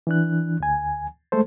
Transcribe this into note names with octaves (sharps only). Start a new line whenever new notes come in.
E3 D4 F#6
D2 G#5
G#3 A3 A4 C5